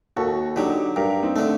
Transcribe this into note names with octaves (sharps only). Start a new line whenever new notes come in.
D#2 F#4 A4
D3 F#3 D#4 G4
G2 G4 A#4
C4 D#4
D3 A3